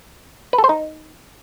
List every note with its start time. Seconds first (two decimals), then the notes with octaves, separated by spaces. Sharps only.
0.53 B4
0.58 A4
0.64 C5
0.69 D#4